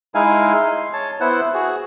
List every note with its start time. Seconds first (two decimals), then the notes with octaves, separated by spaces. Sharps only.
0.15 G#3 D#4 E4 F5 G#5
0.56 C6
0.93 C#5 A5
1.20 B3 E4 C5 F#5
1.54 F#4 G#4